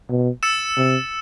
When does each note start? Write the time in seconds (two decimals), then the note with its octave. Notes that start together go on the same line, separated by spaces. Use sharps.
0.10 B2
0.43 E6 A6 C#7 E7
0.77 C3